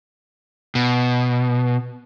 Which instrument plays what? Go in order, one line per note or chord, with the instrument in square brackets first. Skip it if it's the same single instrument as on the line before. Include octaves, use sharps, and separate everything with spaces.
[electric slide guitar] B2